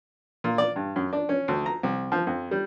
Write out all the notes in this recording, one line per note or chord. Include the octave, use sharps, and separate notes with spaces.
A#2
D5
G2
F#2
D4
C#4
D2
A#5
C2
F3
F2
G3